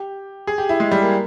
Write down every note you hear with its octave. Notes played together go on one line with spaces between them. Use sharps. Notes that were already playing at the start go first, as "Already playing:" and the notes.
Already playing: G4
G#4
G4
E4
G#3
G3
A#3